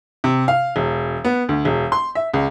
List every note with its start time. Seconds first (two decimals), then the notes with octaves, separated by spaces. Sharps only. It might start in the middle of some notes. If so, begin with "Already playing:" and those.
0.24 C3
0.48 F5
0.76 E1
1.25 B3
1.49 D2
1.65 E1
1.92 C6
2.15 E5
2.34 C#2